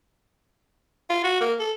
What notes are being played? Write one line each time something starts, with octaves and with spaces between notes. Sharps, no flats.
F4
F#4
A#3
A4